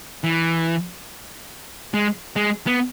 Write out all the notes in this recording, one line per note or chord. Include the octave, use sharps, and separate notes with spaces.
E3
G#3
G#3
B3